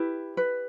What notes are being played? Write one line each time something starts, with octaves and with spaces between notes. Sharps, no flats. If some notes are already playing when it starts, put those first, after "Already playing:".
Already playing: E4 G4 B4
B4